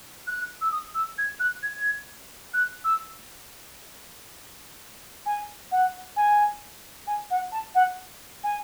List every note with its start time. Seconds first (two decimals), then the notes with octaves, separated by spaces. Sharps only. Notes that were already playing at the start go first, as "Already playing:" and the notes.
0.27 F#6
0.61 E6
0.72 D#6
0.95 E6
1.18 G#6
1.40 F#6
1.63 G#6
2.54 F#6
2.84 E6
5.26 G#5
5.71 F#5
6.16 G#5
7.07 G#5
7.30 F#5
7.52 A5
7.75 F#5
8.44 G#5